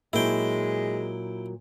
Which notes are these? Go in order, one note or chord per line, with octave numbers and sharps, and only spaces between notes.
A#2 F#3 G#3 E4 G5